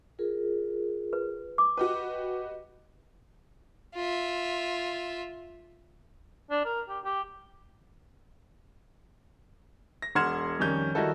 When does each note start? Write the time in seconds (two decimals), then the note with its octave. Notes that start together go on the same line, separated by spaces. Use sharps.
0.19 F4 G#4 A#4
1.13 B4
1.58 D6
1.77 F#4 G4 B4 D#5
3.95 F4 E5
6.50 D4
6.65 A#4
6.89 G4
7.04 G4
10.02 A#6
10.15 E1 F#5 C6 F6 G#6 E7
10.59 F2 D#3 G3 C#4 G6
10.95 D#3 G3 D#4 E4 F#4 A4